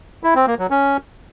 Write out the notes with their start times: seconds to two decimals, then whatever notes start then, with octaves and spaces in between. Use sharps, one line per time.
0.23 E4
0.35 C4
0.47 A#3
0.59 F#3
0.70 C#4